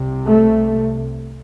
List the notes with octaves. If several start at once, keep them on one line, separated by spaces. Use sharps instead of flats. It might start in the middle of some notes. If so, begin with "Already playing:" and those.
Already playing: C2 C3
A3